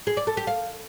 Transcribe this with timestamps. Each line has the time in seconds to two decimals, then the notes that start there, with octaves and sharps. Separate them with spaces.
0.07 G#4
0.17 D5
0.27 A4
0.37 G4
0.47 F5